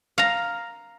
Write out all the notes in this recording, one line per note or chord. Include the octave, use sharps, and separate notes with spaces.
F5 A#5